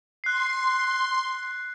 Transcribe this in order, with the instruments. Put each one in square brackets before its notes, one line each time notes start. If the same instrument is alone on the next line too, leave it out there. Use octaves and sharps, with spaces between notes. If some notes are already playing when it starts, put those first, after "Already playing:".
[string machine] C6 [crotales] F#6 C7